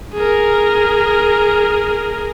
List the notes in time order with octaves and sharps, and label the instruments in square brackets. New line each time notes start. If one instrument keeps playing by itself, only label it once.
[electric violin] G#4 A#4